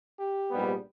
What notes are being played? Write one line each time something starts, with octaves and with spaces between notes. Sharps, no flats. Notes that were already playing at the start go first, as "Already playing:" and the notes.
G4
A#1 G#2 G3 B3